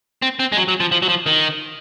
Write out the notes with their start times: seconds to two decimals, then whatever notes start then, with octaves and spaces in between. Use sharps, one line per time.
0.22 C4
0.39 C4
0.52 G#3
0.57 F#3
0.68 F#3
0.80 F3
0.92 F3
1.02 F#3
1.09 F3
1.26 D#3